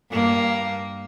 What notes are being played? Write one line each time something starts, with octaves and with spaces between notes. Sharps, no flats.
G2 A#3